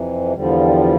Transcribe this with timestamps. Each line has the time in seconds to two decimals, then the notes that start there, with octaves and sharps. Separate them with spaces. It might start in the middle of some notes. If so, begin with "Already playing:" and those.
Already playing: F2 C3 E3
0.33 E2 D3 F3 G3